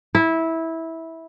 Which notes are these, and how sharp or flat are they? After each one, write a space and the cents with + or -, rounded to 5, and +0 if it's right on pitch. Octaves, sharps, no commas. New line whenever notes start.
E4 -15